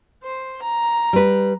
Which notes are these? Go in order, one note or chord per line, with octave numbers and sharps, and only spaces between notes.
C5
A#5
G3 B4